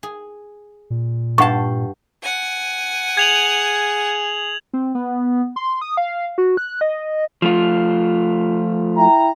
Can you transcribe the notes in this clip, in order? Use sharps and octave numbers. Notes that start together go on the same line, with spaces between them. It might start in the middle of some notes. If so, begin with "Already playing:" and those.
G#4
A#2
G2 F#5 A5 C#6
F#5 G#5
G#4 G#6 F7 F#7
C4
B3
C6
D#6
F5
F#4
F#6
D#5
F3 A3 F4
E4 G5 A#5